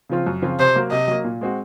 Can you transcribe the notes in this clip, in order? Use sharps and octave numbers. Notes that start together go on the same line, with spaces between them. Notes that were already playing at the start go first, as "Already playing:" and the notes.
C#3 F3 C4 F4
F#2
C#3 F3 C4 F4
C3 C5
F#3 A#3
C3 D#5
F#3 A#3
A#2
G#3 C4 F#4